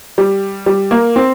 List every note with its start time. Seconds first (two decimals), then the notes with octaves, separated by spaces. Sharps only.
0.18 G3
0.66 G3
0.91 A#3
1.16 C4